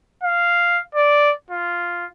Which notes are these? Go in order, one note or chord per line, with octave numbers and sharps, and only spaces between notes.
F5
D5
F4